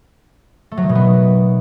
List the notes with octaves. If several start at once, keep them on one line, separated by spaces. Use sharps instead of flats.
A3
F#3
D#3
B2
B3